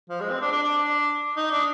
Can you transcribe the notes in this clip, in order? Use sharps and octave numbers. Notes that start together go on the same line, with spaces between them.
F3
G#3
C4
D4
D4
D4
D#4
D4